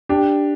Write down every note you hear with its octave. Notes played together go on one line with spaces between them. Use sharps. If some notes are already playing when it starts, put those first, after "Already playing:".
D4 G4